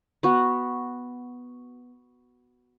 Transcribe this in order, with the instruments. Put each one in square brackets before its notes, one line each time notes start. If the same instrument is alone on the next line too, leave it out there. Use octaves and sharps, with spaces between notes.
[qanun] B3 F#4